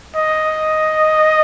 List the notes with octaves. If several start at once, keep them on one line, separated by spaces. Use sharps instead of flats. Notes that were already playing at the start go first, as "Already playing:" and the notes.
D#5